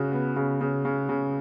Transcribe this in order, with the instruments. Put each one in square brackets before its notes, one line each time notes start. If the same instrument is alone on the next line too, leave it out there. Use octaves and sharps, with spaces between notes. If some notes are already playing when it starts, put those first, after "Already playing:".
Already playing: [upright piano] C#3 F#4
B3
C#3
C#3
C#3
C#3